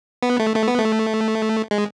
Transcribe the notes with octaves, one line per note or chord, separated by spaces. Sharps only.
B3
A3
A3
B3
A3
G#3